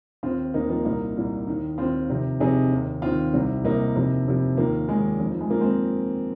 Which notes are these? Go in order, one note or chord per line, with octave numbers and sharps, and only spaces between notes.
D#2 D#3 C4 F4
D#2 D#3 A#3 D#4
F3 A#3
C2 A#2 A#3 D#4
C2 A#2
D#2 D#3
D#2 D#3 C4 F4
F2 C3 D#3
F2 C3 D#3 D#4 G#4
D#2 D#3
D#2 D#3 C4 F4
C2 C3 D#3
C2 C3 D#3 A#3 D#4
F2 C3 D#3
F2 C3 D#3
D#2 D#3 F3 A#3
D#2 D#3 G#3
F2 D#3
F3
G#3
F2 D#3 F3 A#3
G#3 C4